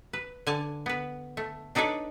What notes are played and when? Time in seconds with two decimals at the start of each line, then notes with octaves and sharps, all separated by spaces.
0.13 B4
0.47 D3 G#5 A5
0.86 B3 B4
1.37 A3
1.75 D4 D#4 A4 B4 C#5 D5